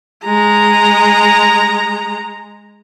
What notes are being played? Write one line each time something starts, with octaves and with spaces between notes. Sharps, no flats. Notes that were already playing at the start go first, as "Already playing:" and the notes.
G#3 A#5